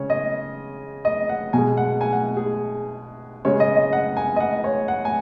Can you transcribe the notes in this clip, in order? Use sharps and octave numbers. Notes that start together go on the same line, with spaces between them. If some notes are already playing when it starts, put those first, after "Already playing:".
Already playing: C#3 G#3 C#5
D#5
D#5
F#5
B2 G#3 G#5
F#5
G#5
F#5
G#4
C#3 G#3 C#5
D#5
D#5
F#5
G#5
D#5
F#5
C#5
F#5
G#5